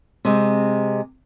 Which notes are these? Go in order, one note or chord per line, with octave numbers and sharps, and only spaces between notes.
C3 G#3 C4